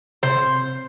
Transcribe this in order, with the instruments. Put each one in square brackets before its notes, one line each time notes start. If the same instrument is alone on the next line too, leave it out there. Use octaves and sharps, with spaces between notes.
[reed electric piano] C3 [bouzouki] C5